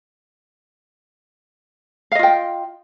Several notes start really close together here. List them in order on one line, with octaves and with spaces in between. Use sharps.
F5 D#5 F4 G5